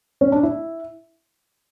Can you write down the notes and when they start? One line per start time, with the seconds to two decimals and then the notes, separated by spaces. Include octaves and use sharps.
0.21 C#4
0.32 D4
0.43 E4